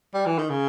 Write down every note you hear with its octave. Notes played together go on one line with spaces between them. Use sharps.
G3
E3
D#3
C#3